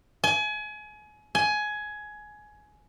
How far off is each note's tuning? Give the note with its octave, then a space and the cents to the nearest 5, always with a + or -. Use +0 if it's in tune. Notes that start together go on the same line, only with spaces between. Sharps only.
G#5 +30
G#5 +15